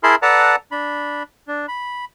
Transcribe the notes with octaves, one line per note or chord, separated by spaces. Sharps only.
E4 G#4 A#4 A5 B5 C6
A4 B4 D5 F#5 A5 A#5
D4 B5
D4
B5